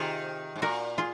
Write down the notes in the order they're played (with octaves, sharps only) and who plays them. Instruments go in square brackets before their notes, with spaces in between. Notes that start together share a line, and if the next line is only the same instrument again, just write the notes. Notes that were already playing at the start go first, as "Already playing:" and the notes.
Already playing: [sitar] C3 D#3 [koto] F4 G#4
[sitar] G#2
[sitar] A#2 [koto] F#4 A#4
[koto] F4 G#4